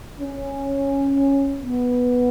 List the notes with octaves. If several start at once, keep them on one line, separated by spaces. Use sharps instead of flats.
C#4
B3